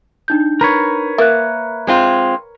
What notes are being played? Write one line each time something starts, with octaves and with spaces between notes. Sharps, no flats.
D4 D#4 G6
A#4 B4 C#5
A#3 E5 F#6
G#3 C4 F4